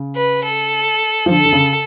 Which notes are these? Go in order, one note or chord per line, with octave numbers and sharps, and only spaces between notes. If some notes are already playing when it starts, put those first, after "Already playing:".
Already playing: C#3
B4
A4
F3
D3 A4
D3
C#3